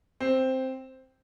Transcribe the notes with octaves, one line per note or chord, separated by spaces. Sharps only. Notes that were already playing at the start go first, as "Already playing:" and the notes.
C4